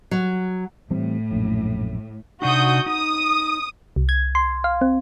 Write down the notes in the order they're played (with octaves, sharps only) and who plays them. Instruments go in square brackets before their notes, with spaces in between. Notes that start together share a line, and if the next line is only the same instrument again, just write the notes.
[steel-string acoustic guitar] F#3
[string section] A2 [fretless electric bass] E3 G3 C4
[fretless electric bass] A#1 F#2
[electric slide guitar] C3 D4 D#4 [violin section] F#4 D#6 G6
[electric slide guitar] D#4 [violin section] D#6
[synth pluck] C2
G#6
C6
F5
C4